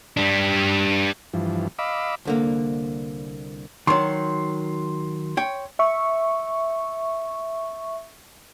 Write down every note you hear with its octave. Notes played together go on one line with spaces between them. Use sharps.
G3 D4
G2 E3 F3
D#5 F5 B5 D6 E6
C2 D3 A#3
D#3 F#3 C6
C#5 G5
E5 C#6